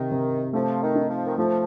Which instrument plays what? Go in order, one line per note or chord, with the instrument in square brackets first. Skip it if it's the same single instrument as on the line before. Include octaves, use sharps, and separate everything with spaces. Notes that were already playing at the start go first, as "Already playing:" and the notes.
Already playing: [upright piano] C3 [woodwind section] D#3
[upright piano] C3
[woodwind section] F3 [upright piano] A3
[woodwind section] D#3
[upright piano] D#4
[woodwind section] F3
D#3
[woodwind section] F3 [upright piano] A3